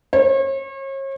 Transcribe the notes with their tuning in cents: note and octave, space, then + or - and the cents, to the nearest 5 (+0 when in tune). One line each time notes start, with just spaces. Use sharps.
C#5 -40